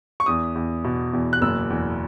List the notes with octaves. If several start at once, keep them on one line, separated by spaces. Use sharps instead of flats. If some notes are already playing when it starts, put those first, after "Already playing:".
C#6
E2 D#6
E2
B2
E2
F#6
F#1 E6
E2